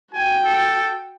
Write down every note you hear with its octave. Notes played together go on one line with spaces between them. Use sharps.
F#4 G5 G#5
A4